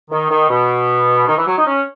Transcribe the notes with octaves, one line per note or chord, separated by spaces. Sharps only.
D#3
D#3
B2
D#3
E3
F#3
D#4
C#4